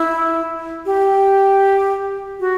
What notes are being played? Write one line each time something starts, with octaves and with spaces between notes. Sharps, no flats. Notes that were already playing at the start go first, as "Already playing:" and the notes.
Already playing: E4
G4
F#4